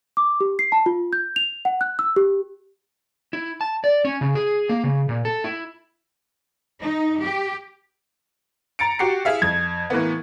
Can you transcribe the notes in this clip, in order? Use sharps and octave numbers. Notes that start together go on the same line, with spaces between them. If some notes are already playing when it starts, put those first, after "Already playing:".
D6
G4
C7
A5
F4
G6
F7
F#5
F#6
E6
G4
E4
A5
D5
C#4
C#3
G#4
A#3
C#3
A#2
A4
E4
D#4
G4
A#5 A6 C#7 D7
F#4 G4 C7 C#7
E4 G#4 E5 F5
F2 G#6
A2 E3 A#3 B3